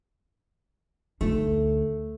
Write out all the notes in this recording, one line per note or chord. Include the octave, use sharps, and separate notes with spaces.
D2 A3 D#4